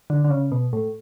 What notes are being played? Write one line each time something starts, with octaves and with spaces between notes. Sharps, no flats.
D3
D3
C#3
B2
A2